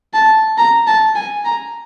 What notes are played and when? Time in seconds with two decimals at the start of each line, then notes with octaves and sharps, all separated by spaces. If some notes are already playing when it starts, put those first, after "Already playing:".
0.14 A5
0.57 A#5
0.87 A5
1.15 G#5
1.45 A#5